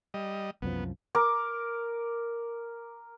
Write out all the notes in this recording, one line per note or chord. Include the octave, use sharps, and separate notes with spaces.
G3 D#5
C2 F#2 F3 B3
A#4 D6